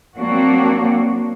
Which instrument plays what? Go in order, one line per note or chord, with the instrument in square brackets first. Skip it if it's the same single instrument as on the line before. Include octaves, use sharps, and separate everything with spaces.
[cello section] F#3 A#3 C4 D4 F#4